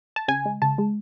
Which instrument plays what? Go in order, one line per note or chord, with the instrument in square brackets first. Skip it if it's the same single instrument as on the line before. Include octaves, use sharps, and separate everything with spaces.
[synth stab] A5
C#3 G#5
G#3
C#3 A5
G#3